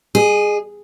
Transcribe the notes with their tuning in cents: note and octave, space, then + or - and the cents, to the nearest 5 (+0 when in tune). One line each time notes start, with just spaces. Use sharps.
G#4 +0 D#5 -35